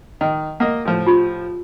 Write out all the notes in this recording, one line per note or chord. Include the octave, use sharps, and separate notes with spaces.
D#3 D#5
A#3 D#5 F#5
A2 F3
F4 G4 B5